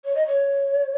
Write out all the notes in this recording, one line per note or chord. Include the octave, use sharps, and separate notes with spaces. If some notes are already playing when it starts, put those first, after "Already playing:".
C#5
D#5
C#5